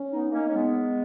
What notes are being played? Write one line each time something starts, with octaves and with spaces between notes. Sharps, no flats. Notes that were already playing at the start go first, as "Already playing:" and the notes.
Already playing: C#4
B3 D#4
A#3 C#4 D#4
C#4
G#3 B3